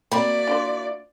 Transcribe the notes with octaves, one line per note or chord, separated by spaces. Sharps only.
A#3 C4 E4 F#4 D5 B5
D4 F4 C5